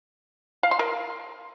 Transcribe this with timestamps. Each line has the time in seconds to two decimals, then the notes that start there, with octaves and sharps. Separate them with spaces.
0.63 F5
0.71 C6
0.79 A#4